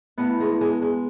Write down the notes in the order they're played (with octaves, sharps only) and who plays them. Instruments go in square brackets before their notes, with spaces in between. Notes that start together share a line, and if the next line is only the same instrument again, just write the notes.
[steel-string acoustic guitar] A2 [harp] B3
[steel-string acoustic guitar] G#3
G#3
G#3